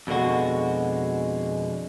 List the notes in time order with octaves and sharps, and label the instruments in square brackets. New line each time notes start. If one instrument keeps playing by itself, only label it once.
[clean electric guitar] F2 B2 D3 G#3 F#4